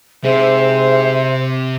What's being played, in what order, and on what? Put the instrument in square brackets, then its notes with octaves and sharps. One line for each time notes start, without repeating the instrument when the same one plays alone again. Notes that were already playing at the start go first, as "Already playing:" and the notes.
[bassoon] G#2 [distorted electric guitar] C3 [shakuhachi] C5 [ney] E5